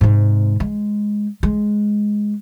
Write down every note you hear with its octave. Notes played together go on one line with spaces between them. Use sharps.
G#2 C3
G#3
G#3